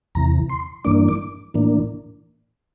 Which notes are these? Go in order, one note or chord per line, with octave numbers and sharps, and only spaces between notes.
E2 C3 E3 A#5
C6
G2 E3 A#3 D4 D6
D6
A2 E3 A#3 D4